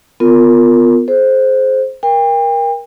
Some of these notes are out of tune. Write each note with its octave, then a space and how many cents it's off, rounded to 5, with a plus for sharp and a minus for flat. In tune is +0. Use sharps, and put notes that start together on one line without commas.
B3 +20 F4 +5 A#4 -15
G#4 +40 C5 +0
A#4 +20 G5 +35